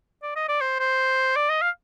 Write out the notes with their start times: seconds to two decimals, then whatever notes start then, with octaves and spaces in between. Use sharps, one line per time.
0.23 D5
0.36 D#5
0.48 D5
0.61 C5
0.79 C5
1.36 D5
1.49 D#5
1.62 F5